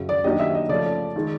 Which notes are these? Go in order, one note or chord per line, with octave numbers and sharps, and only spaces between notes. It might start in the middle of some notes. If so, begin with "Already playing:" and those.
Already playing: F#2 C#3 F#3
D5
D#3 F#3 A#3 D4 G4 D#5
E5
D#5
C#3 F3 A3 D5
D#3 G#3